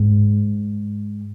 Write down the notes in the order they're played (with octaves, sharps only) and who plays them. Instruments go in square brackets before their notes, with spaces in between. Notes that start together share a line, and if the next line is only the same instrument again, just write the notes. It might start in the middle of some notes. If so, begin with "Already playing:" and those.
Already playing: [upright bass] G#2